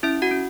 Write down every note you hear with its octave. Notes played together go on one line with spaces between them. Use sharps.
C#4 E4 E5
F#4 F#5
C#4